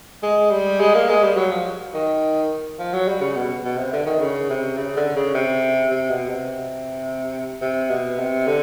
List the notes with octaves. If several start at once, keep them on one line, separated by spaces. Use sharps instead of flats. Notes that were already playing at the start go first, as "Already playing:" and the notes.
G#3
G3
G#3
A#3
G#3
G3
F#3
F3
D#3
F3
F#3
G3
C#3
B2
B2
C3
D3
D#3
C#3
C3
C#3
D3
C#3
C3
C3
B2
C3
C3
B2
C3
D3